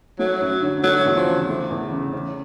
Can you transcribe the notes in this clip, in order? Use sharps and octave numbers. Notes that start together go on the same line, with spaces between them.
F#3 A3
F#2
D3
F#3 A3
E2
F3
C#3
A3
E2
C#3
C#4